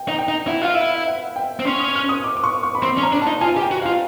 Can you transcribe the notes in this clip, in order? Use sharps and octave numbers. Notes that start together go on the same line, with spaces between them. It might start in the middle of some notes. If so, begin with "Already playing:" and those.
Already playing: G5
D#4
G5
D#4
E4 F#5
F4 F5
E4 E5
F5
F#5
G5
C4
C#4 C6
D#6
F6
D#6
D6
D6
C#6
C#6
B5
C4 C6
C#4
A#5
D4
A5
D#4
F4 G#5
G4
G5
F#4
F4 F5